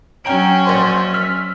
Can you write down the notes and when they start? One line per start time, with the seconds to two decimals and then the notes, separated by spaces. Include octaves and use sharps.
0.25 F#3 C#4 G5 A#5 D7
0.65 A#1 C5 C6
1.14 E6 F6 B6